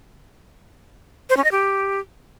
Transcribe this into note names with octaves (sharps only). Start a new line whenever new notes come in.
C5
C#4
D#5
G4